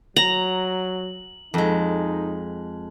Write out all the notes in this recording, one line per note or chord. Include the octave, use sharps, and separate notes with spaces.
F#3 A#5 F#7
F2 G#3 D#4